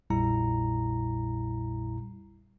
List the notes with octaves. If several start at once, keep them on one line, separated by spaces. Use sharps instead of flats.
A#1 F2 A#2 G3 E4 A#5